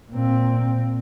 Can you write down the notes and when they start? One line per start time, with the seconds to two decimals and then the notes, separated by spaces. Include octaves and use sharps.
0.11 A#2 C4